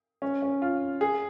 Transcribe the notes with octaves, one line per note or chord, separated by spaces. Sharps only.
C#4
C#4
F4
G#4